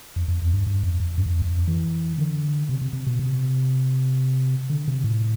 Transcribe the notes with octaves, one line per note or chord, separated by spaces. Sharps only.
F2
F2
E2
G2
G2
F2
F2
G2
F2
E2
F2
E3
D3
C3
C3
C3
B2
C3
D3
C3
A2